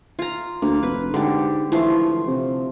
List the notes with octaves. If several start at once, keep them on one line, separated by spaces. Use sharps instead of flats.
F4 A#5
D2 A#3
F1 B4
G#2 D3 G4
E3 F3 A3 C6
C3